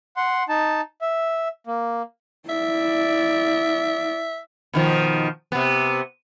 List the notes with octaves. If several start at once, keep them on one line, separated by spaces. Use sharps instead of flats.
F#5 C6
D#4 A5
E5
A#3
E4 D5 E5
B2 D#3 F3
C3 B3